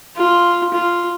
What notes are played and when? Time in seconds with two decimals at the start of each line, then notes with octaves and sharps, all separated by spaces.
0.16 F4
0.74 F4